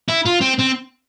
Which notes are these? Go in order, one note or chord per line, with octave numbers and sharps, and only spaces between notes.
E4
F4
C4
C4